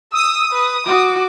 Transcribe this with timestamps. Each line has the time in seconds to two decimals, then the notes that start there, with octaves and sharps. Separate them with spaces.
0.13 D#6 E6
0.53 B4
0.87 F#4 D6